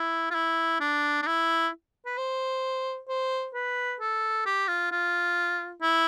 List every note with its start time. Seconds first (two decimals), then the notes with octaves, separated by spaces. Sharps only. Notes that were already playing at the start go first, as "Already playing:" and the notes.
Already playing: E4
0.30 F4
0.35 E4
0.80 D4
1.22 D4
1.27 E4
2.06 B4
2.18 C5
3.08 C5
3.54 B4
4.00 A4
4.46 G4
4.68 F4
4.91 F4
5.82 E4